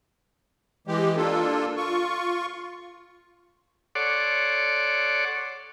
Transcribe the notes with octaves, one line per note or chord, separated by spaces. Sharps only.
E3 G#3 G4
A#3 D4 F4 A4
F4 C#6
A4 C#5 D5 F#5 C6 D6